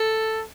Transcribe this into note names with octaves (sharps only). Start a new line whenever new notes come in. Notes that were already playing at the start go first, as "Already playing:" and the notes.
Already playing: A4